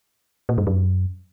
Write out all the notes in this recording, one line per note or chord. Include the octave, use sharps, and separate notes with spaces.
A#2
G2
F#2